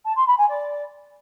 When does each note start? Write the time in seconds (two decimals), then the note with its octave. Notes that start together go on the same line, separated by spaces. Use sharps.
0.05 A5
0.16 C6
0.27 B5
0.38 G#5
0.49 D5